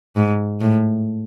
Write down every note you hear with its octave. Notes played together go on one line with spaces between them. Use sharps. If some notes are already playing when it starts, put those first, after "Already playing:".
G#2
A2